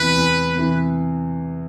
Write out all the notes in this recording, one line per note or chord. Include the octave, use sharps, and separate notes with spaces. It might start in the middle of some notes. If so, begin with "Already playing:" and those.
Already playing: E2 C3 E3 B4
E2
C3 E3